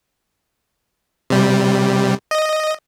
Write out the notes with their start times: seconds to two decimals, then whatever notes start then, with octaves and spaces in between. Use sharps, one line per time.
1.30 C3 G3
2.31 D#5